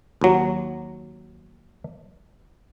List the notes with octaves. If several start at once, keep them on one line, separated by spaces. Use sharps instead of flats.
D#2 F#3